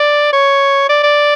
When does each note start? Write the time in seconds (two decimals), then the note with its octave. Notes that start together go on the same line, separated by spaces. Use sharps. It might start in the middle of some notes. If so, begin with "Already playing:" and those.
Already playing: D5
0.33 C#5
0.89 D5
1.03 D5